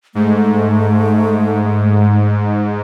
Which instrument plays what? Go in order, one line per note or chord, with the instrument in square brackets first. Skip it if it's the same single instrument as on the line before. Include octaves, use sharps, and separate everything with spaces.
[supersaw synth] G#2 [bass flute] A3